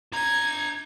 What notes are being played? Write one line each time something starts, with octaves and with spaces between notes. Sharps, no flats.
D4 A#5 G#6